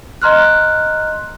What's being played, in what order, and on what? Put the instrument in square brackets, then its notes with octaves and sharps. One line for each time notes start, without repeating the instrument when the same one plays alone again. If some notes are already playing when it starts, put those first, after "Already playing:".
[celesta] D#5 A#5 C6 F6 F#6